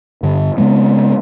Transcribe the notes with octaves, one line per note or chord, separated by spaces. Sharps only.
G2 D3
C#3 G#3 B3 C4